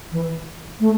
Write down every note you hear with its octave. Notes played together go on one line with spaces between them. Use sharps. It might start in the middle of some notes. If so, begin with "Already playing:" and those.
E3
A3